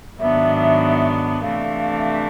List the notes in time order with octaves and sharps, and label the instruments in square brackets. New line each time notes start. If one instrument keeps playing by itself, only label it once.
[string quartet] G#2 D#3 F#3 B3 D4 [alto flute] E5
[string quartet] C3 E3 A3 D4 [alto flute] F5